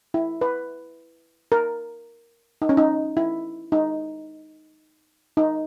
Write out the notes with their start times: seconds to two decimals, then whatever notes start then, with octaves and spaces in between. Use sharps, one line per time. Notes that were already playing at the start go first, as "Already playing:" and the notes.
0.14 E4
0.41 B4
1.52 A#4
2.62 D#4
2.69 C#4
2.77 D#4
3.17 E4
3.72 D#4
5.37 D#4